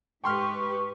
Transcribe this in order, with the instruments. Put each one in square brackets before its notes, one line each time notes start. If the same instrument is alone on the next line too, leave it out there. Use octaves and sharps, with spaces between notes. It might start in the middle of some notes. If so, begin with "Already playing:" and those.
[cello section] G#2 G4 B4 [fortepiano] G5 C6 F6 [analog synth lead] C#6